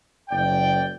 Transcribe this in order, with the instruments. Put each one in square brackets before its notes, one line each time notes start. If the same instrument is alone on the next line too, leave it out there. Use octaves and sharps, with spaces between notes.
[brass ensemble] F#1 D5 G5